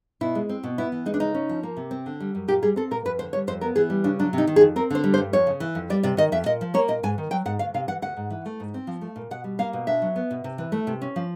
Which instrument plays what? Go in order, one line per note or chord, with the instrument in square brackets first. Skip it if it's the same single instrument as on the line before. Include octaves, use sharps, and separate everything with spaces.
[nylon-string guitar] B2 E4
G#3
C4
B2
B3 E4
E3
G#3 D#4
D4
C#3 D#4
C#4
F3
A#3
C3
C4
D3
G3
F#2
A#2 G4
G3 G#4
C4 A4
A#2 A#4
F2 B4
D3 C5
G3 C#5
F2 C5
B3 A#4
E3 G#4
G3
C#3 D4
F#3 D4
C3
D#4
D#3
G#4
F2
C4 A#4
D3 C5
G3
C5
G2
F2 C#5
C#3
E3
F2
G3 D5
C3 D5
D#3 D#5
F2 E5
A#2 D#5
F3
A#3 C#5
A#2 D#5
G#2 G#5
D#3
F#3 G5
G#2 F#5
D2 F5
C3 F5
E3 F#5
D2 F#5
G#2
E3
A3
G#2
C4
F3
A3
A#2
B2 F#5
G3
A#3 F5
B2
D4 E5
F#3
B3
B2
C3
E3
A3
C3
C#4
F3